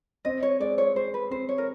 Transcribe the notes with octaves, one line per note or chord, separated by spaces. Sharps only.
C4 D#5
C#5
G#3 D5
C#5
G#3 C5
B4
C4 C5
C#5
A#4